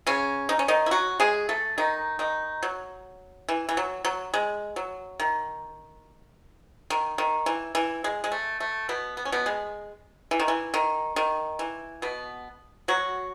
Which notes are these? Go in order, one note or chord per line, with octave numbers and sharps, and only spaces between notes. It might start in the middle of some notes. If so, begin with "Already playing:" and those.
C#3 C#4
D#4
C#4
D#3 D#4
E4
F#3 F#4
G#3 G#4
A3 A4
D#3 D#4
D#3 D#4
F#3
E3
E3
F#3
F#3
G#3
F#3
D#3
D#3
D#3
E3
E3
G#3
G#3
A3
A3
B2 B3
B3
C#4
B2 B3
G#3
E3
D#3
E3
D#3
D#3
E3
B2 B3
F#3 F#4